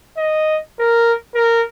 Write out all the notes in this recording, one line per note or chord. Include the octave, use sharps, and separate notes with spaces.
D#5
A#4
A#4